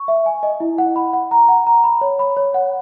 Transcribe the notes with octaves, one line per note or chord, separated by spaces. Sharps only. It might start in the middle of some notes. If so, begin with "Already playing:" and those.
Already playing: C#6
E5
G#5
D#5
E4
F#5
B5
F#5
A#5
F#5
A#5
B5
C#5
B5
C#5
F#5